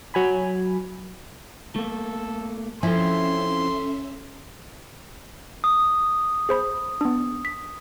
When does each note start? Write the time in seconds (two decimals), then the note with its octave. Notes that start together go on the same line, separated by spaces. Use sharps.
0.14 F#3 G#5 B5
1.76 A3 A#3 A4
2.83 F3 C4 C#4 E4 A4 E5 G#5 C6
5.64 D#6
6.49 G#4 C5 B5
7.01 B3 D4
7.45 B6